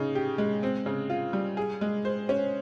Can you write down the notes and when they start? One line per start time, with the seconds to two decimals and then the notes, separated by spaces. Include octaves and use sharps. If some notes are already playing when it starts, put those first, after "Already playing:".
Already playing: C#3 D#4
0.15 G4
0.38 G#3
0.63 C4
0.86 C#3
1.10 F4
1.33 G3
1.57 G#4
1.81 G#3
2.05 C5
2.29 C#4